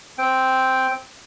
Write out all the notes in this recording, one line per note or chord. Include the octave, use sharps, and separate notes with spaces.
C4 G5